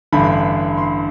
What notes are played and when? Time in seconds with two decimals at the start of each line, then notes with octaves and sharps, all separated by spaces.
0.12 A1 G2 D3 B5
0.78 C6